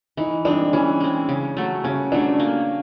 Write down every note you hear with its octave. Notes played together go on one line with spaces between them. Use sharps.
E3 D#4
G#3 C4 D4
E3 C#4
G#3 C4
C#3
F#3 A3
C#3 C#4
F#3 A3 D4
A#3